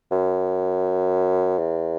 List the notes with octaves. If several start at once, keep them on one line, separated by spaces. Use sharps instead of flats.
F#2
E2